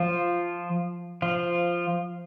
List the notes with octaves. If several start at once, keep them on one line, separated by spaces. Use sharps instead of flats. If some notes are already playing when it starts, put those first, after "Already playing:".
Already playing: F3 F4
F3 F4